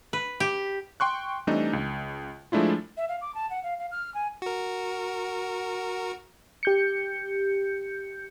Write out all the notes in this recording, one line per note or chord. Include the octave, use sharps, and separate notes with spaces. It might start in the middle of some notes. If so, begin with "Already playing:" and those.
B4
G4
G5 C6 C#6 F#6
E3 G3 A3 C4 D4 D#4
C#2
F3 G#3 A3 D4 E4 F4
E5
F5
D6
A5
F#5
F5
F5
F6
G#5
F#4 A#4
G4 G6 C#7